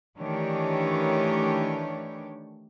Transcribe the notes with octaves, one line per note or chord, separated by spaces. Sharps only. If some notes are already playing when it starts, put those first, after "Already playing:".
D#3 E3 A3 D4 G4 C#5